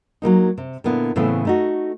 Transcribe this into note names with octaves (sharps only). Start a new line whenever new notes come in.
F#3 G3 A#3 D#4
C3
A#2 D3 B3 E4
A2 C#3 E3 A3 B3 C4
A3 D#4 F#4